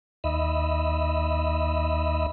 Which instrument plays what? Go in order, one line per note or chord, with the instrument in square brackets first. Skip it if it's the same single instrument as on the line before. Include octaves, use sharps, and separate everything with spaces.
[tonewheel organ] D#2 D#5 E5 B5